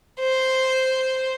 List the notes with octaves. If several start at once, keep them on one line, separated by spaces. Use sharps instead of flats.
C5